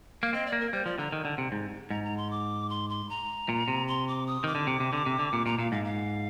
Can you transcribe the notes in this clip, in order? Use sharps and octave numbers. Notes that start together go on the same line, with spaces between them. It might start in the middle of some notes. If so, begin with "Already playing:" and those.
A#3 F5
C4 D#5
D5
A#3
A#4
G3 C5
F3 D5
D3 A#5
D#3
D3
C3
G#2
G#2 A#5
A#5
C6
D6
C6
C6
A#5
A#2
C3
C6
D6
D#6
D#3 D6
D3
C3
C3
D3
C3
D3
A#2
A#2 A#5
A#2 F5
G#2 F5
F5